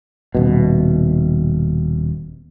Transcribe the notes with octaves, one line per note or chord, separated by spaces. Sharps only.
D#1 B2